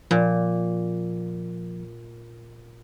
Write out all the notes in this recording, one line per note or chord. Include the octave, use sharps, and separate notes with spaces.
A#2 F3